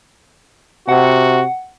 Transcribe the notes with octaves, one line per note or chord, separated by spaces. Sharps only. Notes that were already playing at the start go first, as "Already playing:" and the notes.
C3 F#4 F#5